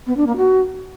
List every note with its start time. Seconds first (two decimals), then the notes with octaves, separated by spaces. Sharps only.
0.07 B3
0.17 D4
0.27 A#3
0.37 F#4